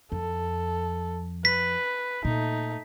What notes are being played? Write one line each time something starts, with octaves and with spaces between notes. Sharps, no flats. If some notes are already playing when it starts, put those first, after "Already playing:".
F2 A4
B4 B6
A#2 A3 D#4